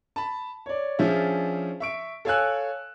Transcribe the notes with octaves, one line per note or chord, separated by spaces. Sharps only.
A5 B5
C#5 D5
F3 C#4 D4 F4 G#4 E5
E5 C#6 D7
A4 C#5 F5 G#5 E6 F#6